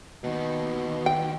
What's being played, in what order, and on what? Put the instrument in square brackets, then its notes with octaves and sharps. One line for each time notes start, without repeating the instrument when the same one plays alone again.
[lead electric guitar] D#2 D#3 [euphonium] B2
[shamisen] G5